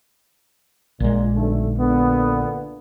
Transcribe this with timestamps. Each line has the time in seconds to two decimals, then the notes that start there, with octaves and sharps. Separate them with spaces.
1.00 A#1 A#2 G#3
1.36 B1 D3 A3
1.79 A#2 D3 B3